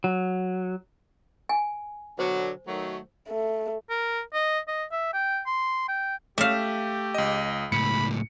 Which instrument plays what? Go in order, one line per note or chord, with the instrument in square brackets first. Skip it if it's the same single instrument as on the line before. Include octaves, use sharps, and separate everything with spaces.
[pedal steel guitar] F#3
[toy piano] G#5
[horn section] B2 D3 F#3 [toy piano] C5
[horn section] D#3 F#3 A3
[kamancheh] A3
[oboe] A#4
D#5
D#5
E5
G5
C6
G5
[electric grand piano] A3 [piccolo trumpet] G4 [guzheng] E5 F5
[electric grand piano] C#2 D#5
[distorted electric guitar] C#2 A2 [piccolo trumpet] B5 [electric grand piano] C#7